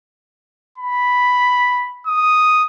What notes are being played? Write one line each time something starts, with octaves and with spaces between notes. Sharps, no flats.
B5
D#6